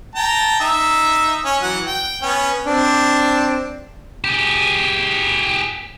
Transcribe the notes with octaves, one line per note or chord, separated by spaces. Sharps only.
G5 A5 A#5
D#4 E5
C#4
E3 F#3 F#5
G5
B3 C#4
C4 D4
G4 G#4